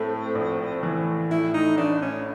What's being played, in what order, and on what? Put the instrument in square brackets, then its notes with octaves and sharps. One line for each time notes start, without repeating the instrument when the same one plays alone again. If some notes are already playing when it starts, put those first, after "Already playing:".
Already playing: [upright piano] A2 A3 [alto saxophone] C4
[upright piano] A#1
E3
[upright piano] A2 [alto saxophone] E4
[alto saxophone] D#4
[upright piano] A1 [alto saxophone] D4
[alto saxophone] C#4